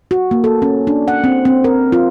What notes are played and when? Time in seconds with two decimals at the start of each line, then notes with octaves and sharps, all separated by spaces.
0.11 F#4
0.31 A#3
0.44 A4
0.62 C#4
0.87 D4
1.08 F#5
1.24 C4
1.45 C4
1.64 A#4
1.92 F4